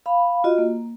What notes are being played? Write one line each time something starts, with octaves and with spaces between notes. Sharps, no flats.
F5 B5
F4 F#4 D#5
A#3